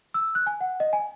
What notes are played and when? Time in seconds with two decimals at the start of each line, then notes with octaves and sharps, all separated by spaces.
0.14 E6
0.35 F#6
0.47 G#5
0.61 F#5
0.80 D#5
0.93 G#5